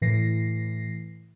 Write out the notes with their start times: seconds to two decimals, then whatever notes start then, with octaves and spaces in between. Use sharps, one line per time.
0.01 A2 E3 A#6 C7